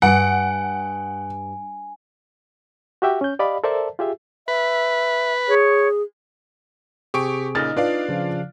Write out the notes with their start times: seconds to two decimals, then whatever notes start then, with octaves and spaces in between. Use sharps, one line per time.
0.02 G2 F#5 G#5
3.02 F#4 G4 E5 G5
3.21 C#4 G6
3.39 G4 D5 D#5 F5 B5
3.64 A4 A#4 C5 D5 E5 A5
3.99 F4 G4 G#4 E5
4.48 B4 E5
5.48 G#4 C#5
7.14 C3 C4 G4 G#4 C#6 D7
7.55 A#2 C#3 D#4 D#5 F6 A6
7.77 D4 F4 B4 D5 F5
8.09 C#3 F3